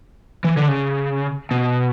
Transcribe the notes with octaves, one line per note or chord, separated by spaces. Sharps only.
E3
D3
C#3
B2